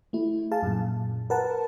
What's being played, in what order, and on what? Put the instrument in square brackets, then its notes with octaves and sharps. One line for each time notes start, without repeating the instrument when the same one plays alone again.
[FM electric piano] A3 E4
G#4 F5 A5
F#2 A#2
A#4 B4 F#5 A5